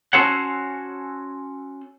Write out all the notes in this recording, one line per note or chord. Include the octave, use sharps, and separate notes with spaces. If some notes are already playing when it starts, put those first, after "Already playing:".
C#4 F#4 A4 C5 C#5 F#5